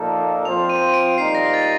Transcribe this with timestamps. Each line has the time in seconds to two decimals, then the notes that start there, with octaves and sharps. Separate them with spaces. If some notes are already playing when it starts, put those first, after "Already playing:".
Already playing: A#2 F3 A#3 D#4 A4
0.45 F3 C4 F4 C5 F7
0.69 D#7
0.94 D7
1.17 A#2 G3 A#3 D#4 C7
1.35 A#6
1.54 A6